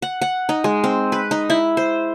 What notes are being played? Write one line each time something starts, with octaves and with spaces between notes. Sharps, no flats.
F#5
F#5
D#4
G#3
C4
B4
D#4
E4
C5